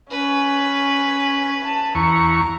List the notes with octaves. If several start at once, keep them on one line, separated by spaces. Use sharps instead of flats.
C#4 B4
A5
E2 A#5 C#6